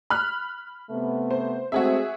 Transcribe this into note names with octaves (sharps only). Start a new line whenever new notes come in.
B5 F6 F#6
C3 A3 B3
C5
G#3 A3 C4 F#4 G#4 E5